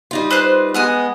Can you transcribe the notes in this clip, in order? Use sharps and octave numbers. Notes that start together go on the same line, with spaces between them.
G3 D#4 F4
B4 C5 F#6
G#3 B3 G#5 D#6 F#6